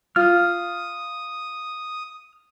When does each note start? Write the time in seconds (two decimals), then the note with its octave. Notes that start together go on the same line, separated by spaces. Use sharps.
0.16 F4 D#6 F6